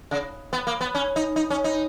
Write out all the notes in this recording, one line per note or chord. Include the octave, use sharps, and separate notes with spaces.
C#3
B3
A#3
B3
C#4
D#4
D#4
C#4
D#4